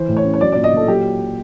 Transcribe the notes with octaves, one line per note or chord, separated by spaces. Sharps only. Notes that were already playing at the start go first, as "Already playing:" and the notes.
Already playing: E3 C5
A2
C#5
C#4
C#5
F#3 D5
A#2 D5
D#5
A#2 A4
F#3 G4